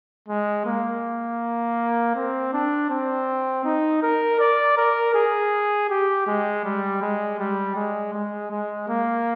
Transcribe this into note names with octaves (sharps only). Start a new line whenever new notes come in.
G#3
A#3
C4
D4
C4
D#4
A#4
D5
A#4
G#4
G4
G#3
G3
G#3
G3
G#3
G#3
G#3
A#3